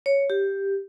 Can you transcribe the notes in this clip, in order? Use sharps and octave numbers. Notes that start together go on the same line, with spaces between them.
C#5
G4